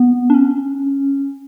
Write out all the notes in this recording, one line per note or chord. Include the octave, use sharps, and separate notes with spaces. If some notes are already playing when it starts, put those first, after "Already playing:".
Already playing: B3
D4
C#4